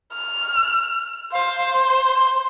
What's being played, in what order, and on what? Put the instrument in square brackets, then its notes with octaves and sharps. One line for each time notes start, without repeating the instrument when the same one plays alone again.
[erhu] F6
[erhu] C5 [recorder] F5
[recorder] C6